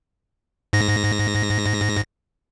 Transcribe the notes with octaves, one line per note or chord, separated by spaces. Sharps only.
G#2 A#6